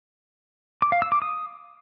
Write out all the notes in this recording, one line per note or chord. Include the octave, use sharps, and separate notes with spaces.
D6
F5
E6
D6
D#6